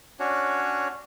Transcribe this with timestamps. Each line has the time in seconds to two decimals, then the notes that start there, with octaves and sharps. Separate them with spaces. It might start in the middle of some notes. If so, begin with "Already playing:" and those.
0.20 C#4 D4 F#4 C#5